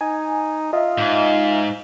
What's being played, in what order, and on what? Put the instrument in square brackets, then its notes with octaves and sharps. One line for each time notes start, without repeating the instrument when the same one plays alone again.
[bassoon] D#4 [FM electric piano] G#5
[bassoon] F4 [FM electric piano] D#5 E5
[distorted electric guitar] G#2